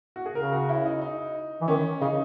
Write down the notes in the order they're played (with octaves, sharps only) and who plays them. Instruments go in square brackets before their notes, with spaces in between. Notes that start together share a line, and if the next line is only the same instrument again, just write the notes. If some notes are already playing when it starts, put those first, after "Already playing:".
[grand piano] F#4
G#4
[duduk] C#3 [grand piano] A#4
[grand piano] F#4
E4
D#4
D#4
[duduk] E3
[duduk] D#3 [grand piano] C#4
[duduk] C#3 [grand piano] D#4